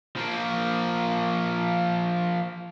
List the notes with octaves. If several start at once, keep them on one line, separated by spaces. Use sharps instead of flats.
F3 A#3